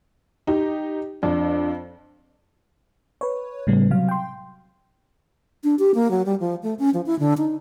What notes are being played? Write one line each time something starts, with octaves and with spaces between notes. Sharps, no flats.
D#4 G4
F2 D4
B4 C#5
A2 C#3 G3 B3
C3 F#3 F5
G5 C6
D4
G4
A#3
F#3
G3
F3
A3
C#4
F3
E4
D3
D#4